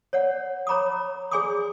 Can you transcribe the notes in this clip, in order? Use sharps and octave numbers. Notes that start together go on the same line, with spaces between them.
C#5 D5 F#5
C#5 A#5 B5 D6 D#6
G#4 D5 G#5 C6 D6 D#6